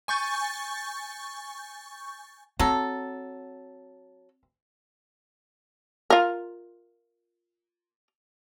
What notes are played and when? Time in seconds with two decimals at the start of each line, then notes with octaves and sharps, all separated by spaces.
0.08 G#5 C#6 G6 A6
2.59 F#3 C4 A4
6.10 F4 A#4